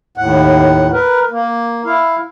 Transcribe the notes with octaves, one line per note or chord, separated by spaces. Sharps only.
D#2 A2 F#5
A#4 B4
A#3
E4 F5